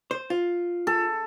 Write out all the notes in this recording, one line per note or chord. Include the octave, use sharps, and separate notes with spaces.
C5
F4
A4